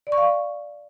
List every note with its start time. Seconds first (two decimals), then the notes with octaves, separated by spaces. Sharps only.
0.07 D5
0.12 C#6
0.18 F5